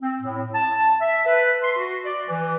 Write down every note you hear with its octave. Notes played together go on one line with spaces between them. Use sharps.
C4
A2
A5
E5
B4
C6
F#4
D5
E3